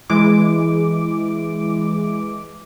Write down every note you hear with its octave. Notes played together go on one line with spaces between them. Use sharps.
E3 G#3 D6